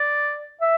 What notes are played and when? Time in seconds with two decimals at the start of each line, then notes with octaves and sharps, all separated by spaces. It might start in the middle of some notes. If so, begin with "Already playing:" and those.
Already playing: D5
0.61 E5